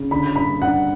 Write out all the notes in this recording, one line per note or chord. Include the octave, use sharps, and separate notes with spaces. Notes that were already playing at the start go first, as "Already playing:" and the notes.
Already playing: C#3
D3 B5
G2 B5
G2 F#5